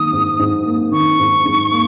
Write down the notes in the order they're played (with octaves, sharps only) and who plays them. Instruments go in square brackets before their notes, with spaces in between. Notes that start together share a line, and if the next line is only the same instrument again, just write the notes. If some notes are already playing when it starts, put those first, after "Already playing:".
Already playing: [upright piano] D#3 A#3 [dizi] D#6
[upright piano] G#2
G#2
A#3
[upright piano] D#3 [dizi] C#6
[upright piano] G#2
G#2
A#3